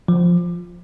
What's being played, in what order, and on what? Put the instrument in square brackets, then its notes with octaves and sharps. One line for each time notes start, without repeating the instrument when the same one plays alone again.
[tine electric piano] F3